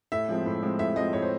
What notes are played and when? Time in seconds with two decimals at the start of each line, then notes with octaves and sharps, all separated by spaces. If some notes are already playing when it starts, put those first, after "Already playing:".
0.12 A2 E5
0.28 F3 G#3 C4
0.46 A2
0.63 F3 G#3 C4
0.79 A2 E5
0.96 F3 G#3 C4 D#5
1.13 A2 C#5
1.22 C5